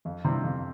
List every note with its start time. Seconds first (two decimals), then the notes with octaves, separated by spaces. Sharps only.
0.05 F2
0.24 C3 E3 G3 C4
0.43 F2